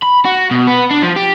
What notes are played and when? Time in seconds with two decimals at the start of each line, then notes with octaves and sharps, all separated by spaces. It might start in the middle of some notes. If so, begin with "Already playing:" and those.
0.03 B5
0.25 F#4
0.51 B2
0.67 B3
0.91 D4
1.03 F3
1.16 G4